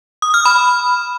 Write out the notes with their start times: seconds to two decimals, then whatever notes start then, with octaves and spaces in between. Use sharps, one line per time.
0.22 D#6
0.34 F6
0.45 B5